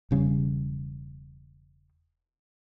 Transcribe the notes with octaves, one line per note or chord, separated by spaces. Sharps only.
E1 C#3 G3